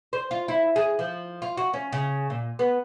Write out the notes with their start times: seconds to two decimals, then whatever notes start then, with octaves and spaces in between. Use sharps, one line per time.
0.13 C5
0.31 F4
0.48 E4
0.76 G#4
0.99 F3
1.42 F4
1.57 F#4
1.74 C#4
1.92 C#3
2.30 A#2
2.59 B3